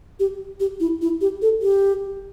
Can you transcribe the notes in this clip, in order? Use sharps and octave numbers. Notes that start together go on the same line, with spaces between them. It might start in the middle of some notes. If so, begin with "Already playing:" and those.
G4
G4
E4
E4
G4
A4
G4